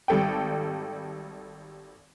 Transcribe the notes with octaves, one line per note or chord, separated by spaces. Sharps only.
G#1 G3 A4 G5